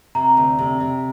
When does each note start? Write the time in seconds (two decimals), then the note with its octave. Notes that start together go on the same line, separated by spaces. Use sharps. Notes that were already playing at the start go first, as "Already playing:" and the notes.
0.15 C3 A#5
0.37 D2
0.59 C3
0.80 C3